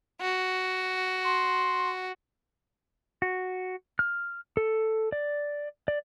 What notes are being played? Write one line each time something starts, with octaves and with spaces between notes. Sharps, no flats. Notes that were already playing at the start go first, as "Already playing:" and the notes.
F#4
C6
F#4
F6
A4
D5
D5